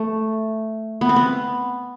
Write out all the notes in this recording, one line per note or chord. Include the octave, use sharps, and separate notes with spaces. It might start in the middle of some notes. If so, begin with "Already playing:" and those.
Already playing: A3
B3
C4
B3